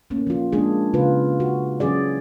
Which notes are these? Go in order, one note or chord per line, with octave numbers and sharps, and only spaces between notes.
A3 A#3 C#4
F3 F4
G#3 A#3 D4 G#4
C#3 F4 B4
F#4
E3 F#3 C#4 G#4 D5